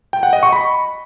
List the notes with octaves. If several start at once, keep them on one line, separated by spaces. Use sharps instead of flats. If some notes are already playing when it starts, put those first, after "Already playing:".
G5
F#5
D#5
C#6
B5